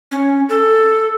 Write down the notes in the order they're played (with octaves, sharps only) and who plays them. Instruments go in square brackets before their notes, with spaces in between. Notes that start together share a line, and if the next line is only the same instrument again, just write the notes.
[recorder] C#4
A4